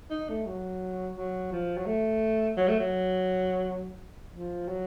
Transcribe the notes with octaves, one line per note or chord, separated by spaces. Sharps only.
D#4
A3
F#3
F#3
F3
F#3
A3
F#3
A3
F#3
F3
F#3